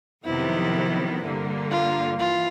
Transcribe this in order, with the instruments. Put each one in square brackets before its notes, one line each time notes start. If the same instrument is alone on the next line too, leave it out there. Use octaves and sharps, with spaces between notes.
[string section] F2 C3 D#3 F#3 B3 [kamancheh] E4
[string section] G2 D3 G3 A#3
[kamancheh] F4
[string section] E3 [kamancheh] F4